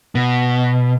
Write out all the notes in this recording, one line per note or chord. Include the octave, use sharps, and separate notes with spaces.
B2